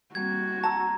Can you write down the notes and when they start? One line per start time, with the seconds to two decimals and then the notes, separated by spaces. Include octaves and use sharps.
0.15 G3 A#3 C4 F#4 G#6
0.64 F#5 A5 A#5 E6